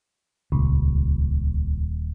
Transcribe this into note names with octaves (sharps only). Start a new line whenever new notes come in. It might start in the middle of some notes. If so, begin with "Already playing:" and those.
D#1 C#2